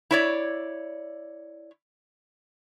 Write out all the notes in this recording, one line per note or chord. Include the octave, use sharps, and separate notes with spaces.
E4 C#5 D5